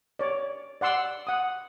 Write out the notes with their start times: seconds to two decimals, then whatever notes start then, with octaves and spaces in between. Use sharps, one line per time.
0.19 C#5 D5
0.81 D5 F#5 C6 E6
1.27 F#5 D#6